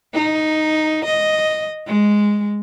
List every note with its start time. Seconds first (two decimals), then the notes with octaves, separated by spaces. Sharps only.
0.13 D#4
1.05 D#5
1.87 G#3